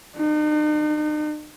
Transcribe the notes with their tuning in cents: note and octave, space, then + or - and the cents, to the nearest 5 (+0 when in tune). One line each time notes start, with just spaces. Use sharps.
D#4 -45